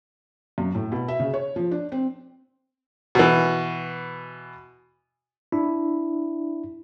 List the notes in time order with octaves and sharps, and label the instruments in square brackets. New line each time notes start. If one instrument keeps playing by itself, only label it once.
[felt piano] F#2
A2
B2
E5
C#3
C#5
F3
D4
C4
[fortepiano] B2 E3
[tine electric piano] D4 E4